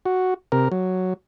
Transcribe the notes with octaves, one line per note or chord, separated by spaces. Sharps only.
F#4
C3 A#4
F#3